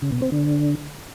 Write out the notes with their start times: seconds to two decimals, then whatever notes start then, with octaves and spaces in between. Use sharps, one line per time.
0.02 C#3
0.12 B2
0.22 C4
0.32 D3